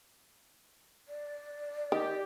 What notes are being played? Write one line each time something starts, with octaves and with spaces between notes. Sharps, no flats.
D5
D#3 G4